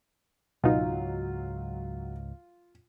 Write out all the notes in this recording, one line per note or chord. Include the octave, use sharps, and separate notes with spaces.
C#2 G#2 B2 F#3 D#4 F4